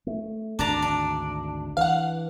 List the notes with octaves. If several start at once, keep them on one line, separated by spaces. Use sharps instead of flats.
A3
G#1 D2 D4 A5 A#5
D4
E3 F5 F#5